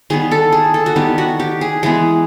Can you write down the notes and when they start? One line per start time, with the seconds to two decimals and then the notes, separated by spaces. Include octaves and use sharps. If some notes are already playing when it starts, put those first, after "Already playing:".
0.10 D#3 G3 B3 G#4
0.31 A4
0.52 G#4
0.74 A4
0.86 F#4
0.96 D#3 G3 B3 G4
1.18 F#4
1.40 G4
1.61 G#4
1.83 E3 G#3 B3 G#4